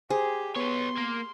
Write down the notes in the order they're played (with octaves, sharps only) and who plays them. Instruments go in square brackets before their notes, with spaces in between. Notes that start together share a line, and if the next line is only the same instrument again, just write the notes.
[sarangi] G4 [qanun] G#4 [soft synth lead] C5
[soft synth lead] B3 [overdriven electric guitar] B4 C#5 [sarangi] C6
[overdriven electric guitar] A#3